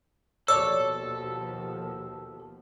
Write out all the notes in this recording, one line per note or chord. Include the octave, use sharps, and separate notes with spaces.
D#2 B2 F3 A4 C#5 D5 E6